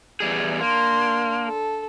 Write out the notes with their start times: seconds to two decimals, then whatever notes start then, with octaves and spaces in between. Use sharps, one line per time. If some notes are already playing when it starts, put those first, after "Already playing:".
0.20 E2 G3 G#4
0.61 A#3 D4 C6
1.46 A4